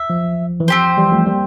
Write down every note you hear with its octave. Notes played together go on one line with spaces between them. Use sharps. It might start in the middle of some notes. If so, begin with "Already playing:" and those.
Already playing: E5
F3
E3
F3 C4 G4 C5
E3 G3
F3 A3
G3 A#3